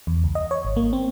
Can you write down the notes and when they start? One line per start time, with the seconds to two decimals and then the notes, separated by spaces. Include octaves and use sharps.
0.07 E2
0.24 C#2
0.35 D#5
0.51 C#5
0.65 G#1
0.77 A#3
0.93 C4